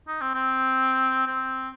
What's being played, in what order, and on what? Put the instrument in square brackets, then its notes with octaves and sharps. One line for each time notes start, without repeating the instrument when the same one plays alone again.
[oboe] D#4
C4
C4
C4